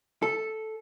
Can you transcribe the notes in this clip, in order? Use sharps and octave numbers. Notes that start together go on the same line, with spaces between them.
A4